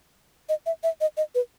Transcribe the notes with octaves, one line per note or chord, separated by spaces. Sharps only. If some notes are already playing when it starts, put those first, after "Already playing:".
D#5
E5
E5
D#5
D#5
B4